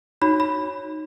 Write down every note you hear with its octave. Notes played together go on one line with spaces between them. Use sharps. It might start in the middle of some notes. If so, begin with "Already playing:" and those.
D#4 F#4 C#5 B5
B5